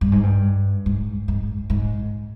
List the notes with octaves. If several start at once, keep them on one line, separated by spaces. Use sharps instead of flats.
G2
G#2
G2
G#2
G#2
G#2